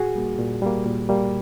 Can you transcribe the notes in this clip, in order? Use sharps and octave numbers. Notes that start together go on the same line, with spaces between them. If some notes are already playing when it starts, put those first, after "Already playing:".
Already playing: A#2 F#4 G#4
G3 A#3
A#2
G3 A#3
A#2
G3 A#3